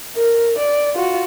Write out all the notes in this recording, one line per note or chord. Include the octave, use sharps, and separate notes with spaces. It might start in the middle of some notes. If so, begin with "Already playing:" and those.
A#4
D5
F4 F#4